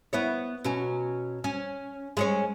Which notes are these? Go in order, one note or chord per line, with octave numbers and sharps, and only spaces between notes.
B3 E4 C#5
B2 F#3 C#4
C#4
G#3 C#4 C#5